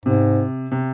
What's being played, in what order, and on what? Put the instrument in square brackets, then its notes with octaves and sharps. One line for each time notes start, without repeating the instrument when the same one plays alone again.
[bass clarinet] G#2 [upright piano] C3
[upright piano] C3